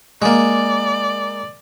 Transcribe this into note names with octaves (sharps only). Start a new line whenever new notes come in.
G#3 A#3 D5